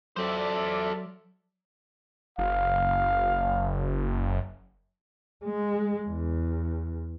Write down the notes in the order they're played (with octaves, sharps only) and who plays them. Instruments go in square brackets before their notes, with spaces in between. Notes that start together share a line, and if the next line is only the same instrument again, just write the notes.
[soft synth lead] F#3 [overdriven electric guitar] A4 C5 [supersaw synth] D5 E5
[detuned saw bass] F#1 [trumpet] F5
[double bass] G#3
E2